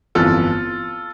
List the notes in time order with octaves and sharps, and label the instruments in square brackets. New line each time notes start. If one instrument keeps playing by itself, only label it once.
[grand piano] G1 F2 E3 F4 A4